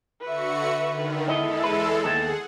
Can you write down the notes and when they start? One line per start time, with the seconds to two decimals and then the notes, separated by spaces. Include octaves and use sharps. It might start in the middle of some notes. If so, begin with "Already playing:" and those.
0.21 D3 F#4 B4 E5 C#7
0.89 D3 D#3
1.28 E2 G#3 B3 E4 A4 D#5
1.64 B4
2.04 D#2 B3 G#4 A4 F#5